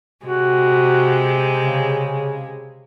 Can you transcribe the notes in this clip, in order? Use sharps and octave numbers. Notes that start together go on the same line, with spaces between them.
C3 G#3 F#4
C#3